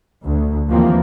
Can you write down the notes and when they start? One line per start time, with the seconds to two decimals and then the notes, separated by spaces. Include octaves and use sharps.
0.25 D2
0.70 D#2 E3 F3 G3 A#3 C4